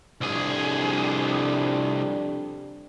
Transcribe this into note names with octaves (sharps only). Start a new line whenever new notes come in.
C2 F2 G3 D4 G#4